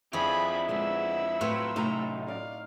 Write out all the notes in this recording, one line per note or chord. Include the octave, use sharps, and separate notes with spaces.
F2 F3 D4 E4 G#4 B5
D3 G#3 B3 B5 E6
A2 F#3 E4 F4 B4 E5
F#2 A2 C3 D#4 A#5
D5 F5